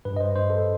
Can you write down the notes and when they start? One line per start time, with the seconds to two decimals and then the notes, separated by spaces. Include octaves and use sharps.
0.05 G2 B4
0.17 D#5
0.21 C5
0.35 G2 C5
0.50 A4